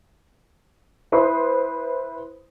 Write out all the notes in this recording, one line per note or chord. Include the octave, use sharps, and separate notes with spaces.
E4 B4 C5 C6 D#6